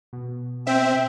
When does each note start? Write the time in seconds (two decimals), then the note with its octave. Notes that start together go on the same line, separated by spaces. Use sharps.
0.13 B2
0.67 C4 E5 G5